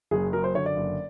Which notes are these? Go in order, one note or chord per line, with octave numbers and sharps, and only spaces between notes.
F#1 G#4
F#2 A#4
C5
D3 C#5
D5
F#1